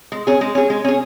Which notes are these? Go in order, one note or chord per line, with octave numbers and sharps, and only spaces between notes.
G#3
C#4 G#4
G#3
C#4 G#4
G#3
C#4 G#4